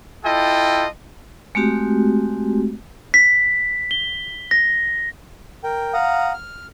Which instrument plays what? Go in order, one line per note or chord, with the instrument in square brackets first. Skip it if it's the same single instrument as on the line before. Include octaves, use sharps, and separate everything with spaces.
[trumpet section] E4 F4 A4 D#5 G5
[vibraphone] G#3 A3 C4 F#4 G4
[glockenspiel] B6
G7
A#6
[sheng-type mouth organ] A#4 G5
F5 F#5 A#5 D#6
F6